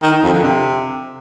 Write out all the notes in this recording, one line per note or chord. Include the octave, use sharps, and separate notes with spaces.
D#3
D#3
F2
D3
C3